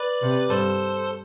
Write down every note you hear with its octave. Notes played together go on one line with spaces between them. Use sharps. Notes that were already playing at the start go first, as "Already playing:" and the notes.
Already playing: B4 D5
C3
G2 A4 C5